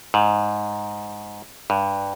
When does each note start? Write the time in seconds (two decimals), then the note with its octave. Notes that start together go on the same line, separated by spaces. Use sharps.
0.14 G#2
1.70 G2